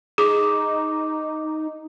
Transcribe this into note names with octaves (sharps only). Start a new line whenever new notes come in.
D#4 G#4 D6